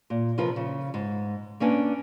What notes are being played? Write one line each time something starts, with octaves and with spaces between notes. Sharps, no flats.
A#2
C3 F3 F4 A#4 B4
C#3
G#2
A#3 C#4 D4 B4